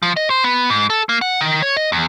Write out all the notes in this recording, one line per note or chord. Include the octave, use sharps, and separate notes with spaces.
F3
D#5
C5
B3
G#2
A4
A#3
F#5
D#3
C#5
D#5
E2